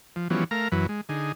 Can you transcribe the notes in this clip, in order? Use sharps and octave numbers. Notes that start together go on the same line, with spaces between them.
F3
E3 F3 G3 B3 C#4 F#4
A3 A#4 F5 A#5
F#2 E3 F#3 B4
G#3
D3 D#4 G#4